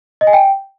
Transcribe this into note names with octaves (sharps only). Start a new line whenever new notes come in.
D#5
G#5
G5